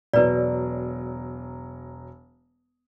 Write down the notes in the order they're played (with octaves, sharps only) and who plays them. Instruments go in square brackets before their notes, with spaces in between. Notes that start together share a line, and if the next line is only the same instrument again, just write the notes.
[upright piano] E1 F#3 [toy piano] B4 D5